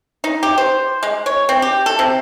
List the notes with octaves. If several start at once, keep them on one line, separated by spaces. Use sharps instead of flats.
D#4
G4
C5
G#3
C#5
C4
G4
A4
C3